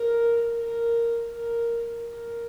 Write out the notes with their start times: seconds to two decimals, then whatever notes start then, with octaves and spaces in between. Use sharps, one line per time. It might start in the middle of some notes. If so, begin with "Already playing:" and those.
Already playing: A#4
0.58 A#4
1.30 A#4
2.03 A#4